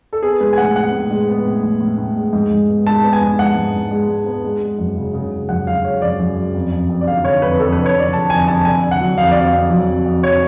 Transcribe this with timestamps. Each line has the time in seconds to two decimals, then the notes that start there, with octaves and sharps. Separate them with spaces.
0.13 A4
0.23 B3 G#4
0.41 G#3 B4
0.53 G#5
0.58 A2 F#5
0.76 B3 F#5
0.93 A2
1.11 G#3
1.29 B3
1.45 A2
1.63 A2
1.81 A2
1.98 A2
2.16 G#3
2.33 G#2
2.51 G#2
2.69 B3
2.87 G#3 A5
3.04 B3
3.13 G#5
3.21 G#2
3.39 G#2 F#5
3.56 G#2
3.74 G#2
3.91 G#3
4.09 G#3
4.26 B3
4.44 G#3
4.61 G#3
4.79 F#2
4.97 C#3
5.14 C#3
5.32 C#3
5.49 F#2 F#5
5.67 F#2 F5
5.84 G#3 C#5
6.02 F#2 D5
6.20 F#2
6.37 F#2
6.54 F2
6.72 F2
6.89 F2
7.01 D5
7.07 D3 F5
7.25 D3 C#5
7.42 F2 B4
7.60 F2 A4
7.73 B4
7.78 D3
7.86 C#5
7.95 F2 D5
8.13 D3 A5
8.30 F2 G#5
8.47 F2 A5
8.65 D3 G#5
8.83 D3
8.91 F#5
9.01 F#3
9.18 F2 F5
9.31 F2 D5
9.45 F5
9.53 F2
9.70 F#3
9.88 F2
10.06 F2
10.23 F2 C#5